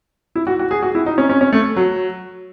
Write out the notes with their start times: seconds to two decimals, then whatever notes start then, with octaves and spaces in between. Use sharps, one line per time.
0.36 E4
0.47 F#4
0.59 F#4
0.71 G#4
0.83 F#4
0.95 E4
1.06 D#4
1.18 C#4
1.29 C#4
1.41 C#4
1.53 A3
1.76 F#3